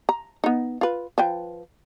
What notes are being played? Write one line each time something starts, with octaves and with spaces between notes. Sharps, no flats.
A#5
B3 D#4
F4 B4
F3 B4 G5